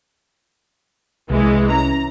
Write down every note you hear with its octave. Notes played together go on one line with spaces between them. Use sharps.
C2 E3 G#3
C#4 A#5